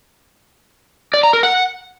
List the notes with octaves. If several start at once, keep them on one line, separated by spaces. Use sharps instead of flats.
D5
A#5
A#4
F#5